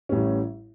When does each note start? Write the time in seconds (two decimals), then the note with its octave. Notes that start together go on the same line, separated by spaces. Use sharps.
0.09 A1 A2 G3 C#4